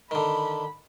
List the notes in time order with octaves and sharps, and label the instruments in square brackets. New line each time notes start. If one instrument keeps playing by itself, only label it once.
[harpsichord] D3 D#3 [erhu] B5